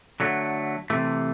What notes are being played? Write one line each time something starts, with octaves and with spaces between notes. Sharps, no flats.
D3 F#3 A3
C3 E3 A3